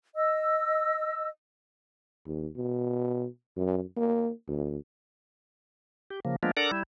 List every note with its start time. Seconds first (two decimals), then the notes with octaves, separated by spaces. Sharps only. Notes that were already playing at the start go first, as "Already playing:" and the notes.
0.15 D#5 E6
2.27 D#2
2.56 B2
3.57 F#2
3.97 A#3
4.48 D2
6.10 G4
6.25 C#3 F3 A#3
6.43 F3 G#3 A#3 B3 D4 F4
6.57 D4 A4 A#4 D5 F#5 A#5
6.71 G3 E4